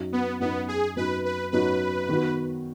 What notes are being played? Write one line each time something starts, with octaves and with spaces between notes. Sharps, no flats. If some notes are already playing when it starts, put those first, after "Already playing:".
Already playing: F#2 F#3 D#4 F#4
B3
F#2 F#3 B3 D#4 F#4
G#4
F#2 F#3 D#4 F#4 B4
B4
F#2 F#3 D#4 F#4 B4
D#3 B3 F#4